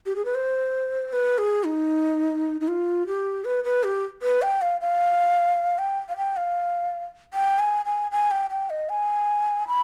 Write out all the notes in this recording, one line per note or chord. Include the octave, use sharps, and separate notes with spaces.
G4
G#4
B4
C5
B4
G#4
D#4
D#4
F4
G4
B4
B4
G4
B4
G5
F5
F5
G5
F5
G5
F5
G5
G#5
G#5
G#5
G5
G5
D#5
G#5
B5